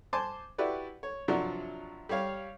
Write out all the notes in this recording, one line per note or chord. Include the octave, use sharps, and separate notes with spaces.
C5 G#5 A5 C6 D6
E4 F#4 G4 B4 D5
C#5
G2 C3 F3 F#3 F#4 D5
G3 G4 C#5 F5